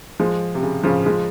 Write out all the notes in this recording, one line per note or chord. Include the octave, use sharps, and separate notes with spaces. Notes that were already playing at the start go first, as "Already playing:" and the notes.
F3 G#3
C3
C#3
C#3 F3
F3 G#3